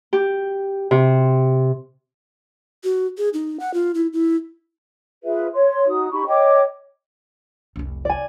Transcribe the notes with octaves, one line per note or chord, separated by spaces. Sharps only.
G4
C3
F#4
G#4
D#4
F#5
F4
E4
E4
F4 G#4 B4 E5
C#5 C6
D#4 F#4 D#6
D#4 G4 B5 C#6
C#5 D#5 G5 D6
F1 C2
D5 G#5